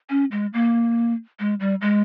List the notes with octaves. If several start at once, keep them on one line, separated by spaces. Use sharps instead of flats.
C#4
G#3
A#3
G#3
G3
G#3